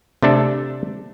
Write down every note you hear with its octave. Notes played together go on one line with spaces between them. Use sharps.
C3 A3 D4 A4